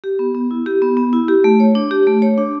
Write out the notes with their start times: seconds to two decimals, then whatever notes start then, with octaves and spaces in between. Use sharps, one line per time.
0.04 G4
0.19 B3
0.35 B3
0.51 E4
0.66 G4
0.82 B3
0.97 B3
1.13 E4
1.28 G4
1.44 A3
1.60 C#5
1.75 D4
1.91 G4
2.07 A3
2.22 C#5
2.38 D4